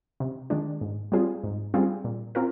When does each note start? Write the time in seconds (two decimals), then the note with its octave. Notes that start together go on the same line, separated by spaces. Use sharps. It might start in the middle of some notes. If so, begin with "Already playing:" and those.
0.20 C3
0.50 D#3 G#3 D4
0.81 G#2
1.12 G3 C4 F4 G#4
1.44 G#2
1.74 G3 C4 F4 G#4
2.04 A#2
2.35 C4 F4 A#4